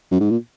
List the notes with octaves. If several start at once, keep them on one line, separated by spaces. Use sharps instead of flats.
F#2
G#2
A#2